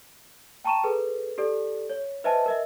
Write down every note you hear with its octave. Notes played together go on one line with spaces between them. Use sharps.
G5 A5 A#5 C#6 D#7 E7
G#4 A4 B4
G4 A4 D5
C#5
B4 C5 D#5 E5 G#5 A5
A#4 D#5 E5